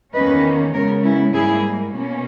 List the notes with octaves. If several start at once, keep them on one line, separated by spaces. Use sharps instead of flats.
E2 D#3 A#3 C#4 B4 D#5
C#3 G#3 B3 A#4 C#5
C#4 E4
G#2 G3 A#3 E4 G#4
B2 A#3 C#4